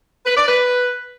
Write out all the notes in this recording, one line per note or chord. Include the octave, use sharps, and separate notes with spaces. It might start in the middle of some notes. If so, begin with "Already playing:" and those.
B4
D5
B4